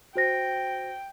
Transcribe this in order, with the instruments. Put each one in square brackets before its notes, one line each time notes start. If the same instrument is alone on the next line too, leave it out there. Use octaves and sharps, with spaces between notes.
[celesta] F#4 C5 A#6 [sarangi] G5